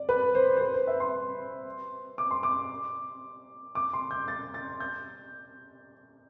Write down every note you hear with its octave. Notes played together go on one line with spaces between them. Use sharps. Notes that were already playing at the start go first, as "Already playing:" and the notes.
Already playing: D5
B4
C5
C5
B4
C5
E5
C6
D6
C6
D6
D6
C6
G6
A6
A6
G6